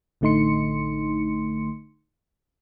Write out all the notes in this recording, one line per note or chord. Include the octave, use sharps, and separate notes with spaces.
A1 D3 A3 D#4 C6 C#7